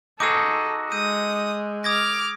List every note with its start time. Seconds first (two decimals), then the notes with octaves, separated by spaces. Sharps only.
0.20 D#4 F#4 G#4 A4 D6 E6
0.92 G#3 D#6 E6 G6 D#7
1.84 D6 D#6 F6 G#6 A#6